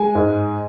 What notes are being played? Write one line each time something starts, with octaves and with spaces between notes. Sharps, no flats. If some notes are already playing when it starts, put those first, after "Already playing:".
Already playing: G#3 G#5
G#2